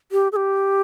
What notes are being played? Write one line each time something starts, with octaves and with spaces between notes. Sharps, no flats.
G4
A4
G4